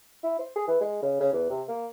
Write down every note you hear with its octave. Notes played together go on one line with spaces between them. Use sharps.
E4
C5
G#4
E3
G#3
C#3
C#3
E2
C3
A#3